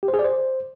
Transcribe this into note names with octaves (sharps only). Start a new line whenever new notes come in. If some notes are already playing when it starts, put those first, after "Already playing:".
G4
C5
G#4
D5
C5